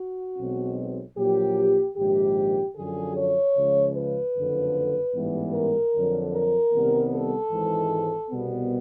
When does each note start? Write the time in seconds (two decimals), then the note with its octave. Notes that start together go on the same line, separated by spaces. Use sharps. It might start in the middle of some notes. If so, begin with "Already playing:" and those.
Already playing: F#4
0.38 B1 B2 G#3 C4
1.17 A#1 A#2 F#3 G4
1.97 A#1 G#2 D#3 G4
2.76 F#2 D3 F3 G#4
3.16 C#5
3.55 C#2 C#3 F3
3.95 B4
4.35 F#1 F2 D3
5.14 A1 G#2 E3 G3 B3
5.53 A#4
5.93 F2 D3 F#3
6.32 A#4
6.73 C2 C3 D#3 G3 B3
7.11 A4
7.51 G#1 G#2 E3
8.30 C2 B2 G3 B3